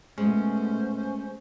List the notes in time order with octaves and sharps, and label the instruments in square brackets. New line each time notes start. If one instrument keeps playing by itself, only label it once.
[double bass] B2 A3 [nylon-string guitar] G#3 [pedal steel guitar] C#4 [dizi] C5